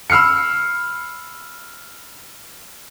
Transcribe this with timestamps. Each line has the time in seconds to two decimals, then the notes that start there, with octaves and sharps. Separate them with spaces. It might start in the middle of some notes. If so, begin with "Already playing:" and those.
0.10 B5 E6 F6 C7 C#7